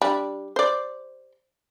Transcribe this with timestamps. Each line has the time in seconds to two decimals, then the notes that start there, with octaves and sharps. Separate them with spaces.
0.02 G3 D4
0.56 C5 D5